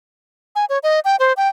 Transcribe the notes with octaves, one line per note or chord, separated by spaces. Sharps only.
G#5
C#5
D#5
G5
C5
G5